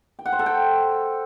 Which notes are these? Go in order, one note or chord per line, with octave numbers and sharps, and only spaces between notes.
G5
F#5
C5
A4
G5